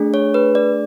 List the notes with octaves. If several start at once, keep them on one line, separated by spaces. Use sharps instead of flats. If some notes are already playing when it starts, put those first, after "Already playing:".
Already playing: A3 D4 G#4
C#5
B4
D5